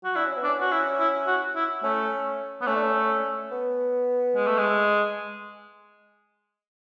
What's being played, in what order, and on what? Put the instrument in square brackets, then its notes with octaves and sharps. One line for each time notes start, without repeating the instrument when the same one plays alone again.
[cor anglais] F#4
[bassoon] D4 [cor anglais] E4
[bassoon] C#4
B3
[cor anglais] D4
[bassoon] C#4
[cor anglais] F#4
E4
E4
F#4
E4
[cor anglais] A3 [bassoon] C#4
[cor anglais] B3
[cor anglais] A3 [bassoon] C#4
[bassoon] D4
C#4
B3
[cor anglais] G#3
A3
G#3